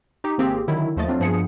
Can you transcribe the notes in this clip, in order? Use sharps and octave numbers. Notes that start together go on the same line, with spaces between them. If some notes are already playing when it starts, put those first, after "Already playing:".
D#4 G4
G#1 A#3 C4 G4 G#4
D3 D#3 F#3 E4
D#2 F3 A3 D#5 A6
F#3 A3 C4 D4 F4
G2 F3 B3 G#4 C#7